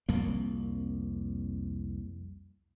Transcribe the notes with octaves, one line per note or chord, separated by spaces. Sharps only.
C2 F2 A#3